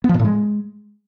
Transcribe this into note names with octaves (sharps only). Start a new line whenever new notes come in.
B3
F3
A#2
A2
G#3